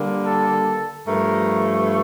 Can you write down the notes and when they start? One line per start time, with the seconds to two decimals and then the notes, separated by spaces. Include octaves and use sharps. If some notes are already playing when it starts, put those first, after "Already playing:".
Already playing: D3 G3 A#3
0.25 A4
1.06 G2 F3 A3 A#4